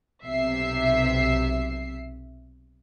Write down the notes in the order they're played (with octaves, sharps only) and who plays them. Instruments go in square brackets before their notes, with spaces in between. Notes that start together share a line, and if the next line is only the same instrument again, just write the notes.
[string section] B1 C3 E5 C7